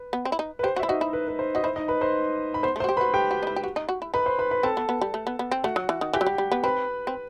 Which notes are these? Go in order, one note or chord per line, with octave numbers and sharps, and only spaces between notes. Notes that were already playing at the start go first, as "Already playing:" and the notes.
Already playing: B4
B3
C4
E4
D#4
B4
G4 C5
F#4
E4 E5
D#4 F#4 D#5
E4
B4
B4
C5
F#4 D#5
E4 C5
D#4 D#5
B4 B5
C5 C6
B5
B3 C5 C6
A3 C5 C6
F#4
G4
B4 B5
F#4
G4 G5
F#4
D#4
E4
G4
F#4
D#4
F#4
E4
D#4 B4 B5
C5 C6
B4 B5
B4 B5
C4 A4 A5
B3
B3
G3
A3
B3
B3
C4
A3 F#4 F#5
F#3
E3
D#3
E3 G4 G5
F#3
G3
G3
B3
C4 B4 B5
C4